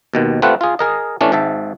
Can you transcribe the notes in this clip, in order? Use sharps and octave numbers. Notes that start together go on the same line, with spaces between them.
D#2 B2 D#3
A3 C4 F4 G4 B4 F#5
F4 G#4
G#4 A#4 D#5
E3 A3 C#4 D4
G#1 G#2 E5 A5